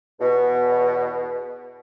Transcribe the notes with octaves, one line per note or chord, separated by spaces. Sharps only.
E2 B2